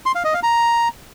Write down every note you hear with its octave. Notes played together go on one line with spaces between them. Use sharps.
C6
F5
D#5
F5
A#5